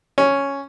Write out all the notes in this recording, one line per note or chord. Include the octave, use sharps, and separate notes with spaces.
C#4